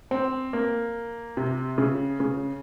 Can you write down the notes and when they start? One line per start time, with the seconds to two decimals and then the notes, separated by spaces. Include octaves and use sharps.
0.11 C4
0.53 A#3
1.37 C3
1.78 C#3
2.20 C#3